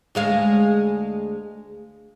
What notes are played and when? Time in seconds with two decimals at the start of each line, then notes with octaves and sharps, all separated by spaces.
0.15 D2 G#3 F5